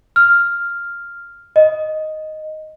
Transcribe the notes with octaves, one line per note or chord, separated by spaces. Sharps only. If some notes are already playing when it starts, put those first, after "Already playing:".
F6
D#5